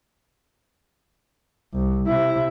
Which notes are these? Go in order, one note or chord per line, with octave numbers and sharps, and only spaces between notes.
C2
C3 E4